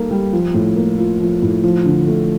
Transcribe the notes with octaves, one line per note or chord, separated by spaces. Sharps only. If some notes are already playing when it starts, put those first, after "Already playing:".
Already playing: G3 A#3 D#4 A4
G3
F3
A2
A#3
F4
F3
A2
F3
D3
A3